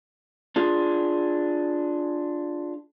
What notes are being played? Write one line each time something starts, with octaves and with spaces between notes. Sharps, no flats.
D4 F4 G#4